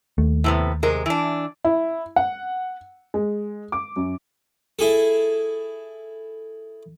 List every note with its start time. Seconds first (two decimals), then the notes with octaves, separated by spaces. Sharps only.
0.18 D#2 A3
0.44 A2 C3 B3
0.83 C3 G#3 A#4
1.06 E3 D4
1.65 E4
2.16 F#5
3.14 G#3
3.72 D6
3.96 F#2
4.79 E4 G#4 A4